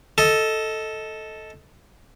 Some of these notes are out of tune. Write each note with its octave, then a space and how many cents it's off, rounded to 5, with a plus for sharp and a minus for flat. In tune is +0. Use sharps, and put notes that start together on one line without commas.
A4 +0 D#5 +15